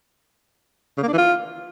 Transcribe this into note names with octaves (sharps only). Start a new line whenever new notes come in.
C#3
A#3
D4
E3
F4